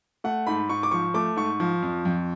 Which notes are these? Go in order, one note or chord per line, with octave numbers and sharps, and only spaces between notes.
A3 F#5
G#2 B5
G#2 C#6
D6
F3 C#6
A3 D6
G#2 C#6
F3
F2
F2